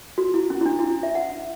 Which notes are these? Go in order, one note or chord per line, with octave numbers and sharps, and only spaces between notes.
F#4
E4
C#4
E4
D4
E4
E5
F#5